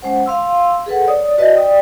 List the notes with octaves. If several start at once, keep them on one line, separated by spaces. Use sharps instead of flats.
G#3 C#4 C5 F#5
F5 C6 E6
G#4 A4 B4 F#5
C#5 D5 D#6
F#4 B4 D5 D#5
D5 G5 D#6